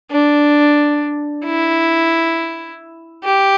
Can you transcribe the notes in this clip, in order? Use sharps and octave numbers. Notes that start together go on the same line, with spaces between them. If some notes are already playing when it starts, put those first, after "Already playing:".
D4
E4
G4